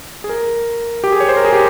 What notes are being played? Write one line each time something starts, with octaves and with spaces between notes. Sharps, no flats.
G#4
A#4
G4
G#4
C#5
C5
A#4
G#4
G4